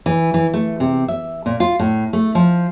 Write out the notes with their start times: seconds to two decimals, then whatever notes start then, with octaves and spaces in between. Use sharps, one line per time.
0.06 E3
0.34 E3
0.54 A3
0.80 C3
1.08 E5
1.46 A#2
1.60 F4
1.79 A2
2.13 A3
2.35 F3